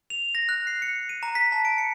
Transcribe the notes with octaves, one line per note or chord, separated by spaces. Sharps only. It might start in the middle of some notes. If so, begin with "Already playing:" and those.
F7
A#6
F#6
C7
C#7
D#7
A#5
B6
A5
D7
C#7